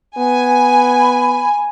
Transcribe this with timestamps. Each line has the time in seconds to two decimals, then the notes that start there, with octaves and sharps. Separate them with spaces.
0.18 B3 G#5
0.60 B5